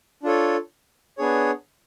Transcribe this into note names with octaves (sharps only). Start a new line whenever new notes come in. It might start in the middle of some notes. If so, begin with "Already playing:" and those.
D4 F4 A4 C#5
B3 D4 G#4 C#5